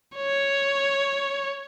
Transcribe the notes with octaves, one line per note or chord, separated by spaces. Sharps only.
C#5